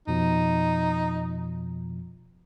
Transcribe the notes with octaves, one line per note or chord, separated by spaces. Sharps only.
F2 B2 F3 D#4